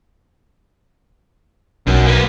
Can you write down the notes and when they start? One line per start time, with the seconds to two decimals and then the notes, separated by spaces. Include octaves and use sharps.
1.87 B1 F#2
2.06 A#3 B4